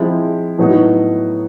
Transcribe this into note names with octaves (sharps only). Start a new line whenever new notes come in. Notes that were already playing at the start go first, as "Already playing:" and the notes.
Already playing: F3 G#3 C4 E4
A2 F#3 B3 D#4 F#4